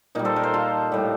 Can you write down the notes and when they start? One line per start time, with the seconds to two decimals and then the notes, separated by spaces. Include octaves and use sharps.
0.15 A#2 G3 D#4
0.25 A4 C5
0.36 A#4
0.43 A4 C5
0.54 F4 A4
0.92 A2 G3